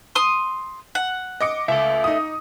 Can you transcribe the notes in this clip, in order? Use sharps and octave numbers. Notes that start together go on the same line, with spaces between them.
C6 D#6
F#5
D#5 D6 C#7
C#2 A4 E5
D#4 D#6